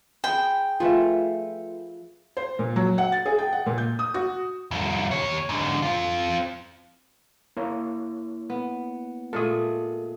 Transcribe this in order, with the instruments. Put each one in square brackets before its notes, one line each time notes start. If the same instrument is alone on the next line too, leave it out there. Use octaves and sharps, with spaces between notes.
[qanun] G#4 C5 [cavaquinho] G5 [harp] B5 C#7
[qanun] F3 [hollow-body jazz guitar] A3 F4 [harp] G#4 B4 E5
[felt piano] C5
A#2
F#3
F#5
A6
G#4
G5
F#5
A#2
G6
D#6
F#4
[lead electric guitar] C2 F2
D#2 C#5
G#2 D3
C4 F4
[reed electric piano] A#3 E4 C#5
[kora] B3
[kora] A#2 G#3 A3 [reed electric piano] A4 D#6